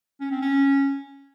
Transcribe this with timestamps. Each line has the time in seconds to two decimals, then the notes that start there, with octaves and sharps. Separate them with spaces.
0.20 C#4
0.31 C4
0.42 C#4